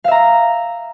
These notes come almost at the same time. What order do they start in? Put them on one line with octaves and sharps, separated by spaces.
F5 E5 A#5